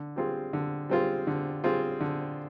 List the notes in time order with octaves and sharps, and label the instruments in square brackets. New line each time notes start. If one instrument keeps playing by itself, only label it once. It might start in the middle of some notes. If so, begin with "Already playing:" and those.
Already playing: [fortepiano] D3
G3 C4 F4 G#4
D3
G3 C4 F4 G#4
D3
G3 C4 F4 G#4
D3